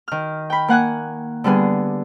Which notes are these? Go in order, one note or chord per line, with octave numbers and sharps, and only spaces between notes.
D#3 F6
G5 B5
A#3 F#5 G#5 F#6
D3 G3 B3 G#4